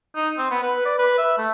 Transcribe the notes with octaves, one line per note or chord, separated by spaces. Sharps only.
D#4
C4
B3
B4
D5
B4
E5
A3